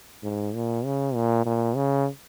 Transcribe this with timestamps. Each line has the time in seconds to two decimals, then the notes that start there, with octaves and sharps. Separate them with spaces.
0.23 G#2
0.55 A#2
0.85 C#3
1.15 A#2
1.46 A#2
1.76 C#3